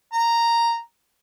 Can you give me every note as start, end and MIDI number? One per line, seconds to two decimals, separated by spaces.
0.13 0.79 82